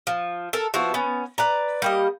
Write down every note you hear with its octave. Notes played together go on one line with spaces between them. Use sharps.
F3
A4 A#4
F3 B3 E4 F#4
B3 C#4
B4 D5 A#5
G3 A#3 D#5